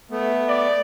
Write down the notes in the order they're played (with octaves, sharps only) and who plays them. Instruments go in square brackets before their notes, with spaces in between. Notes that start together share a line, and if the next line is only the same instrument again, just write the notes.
[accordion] A3 B3
[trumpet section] D5